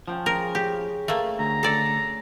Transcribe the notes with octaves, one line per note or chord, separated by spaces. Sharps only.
F3 C#4 G5 A5
C#3 A#4 G#5
C#3 G4
A3 A#3
D2 A#5
A4 D5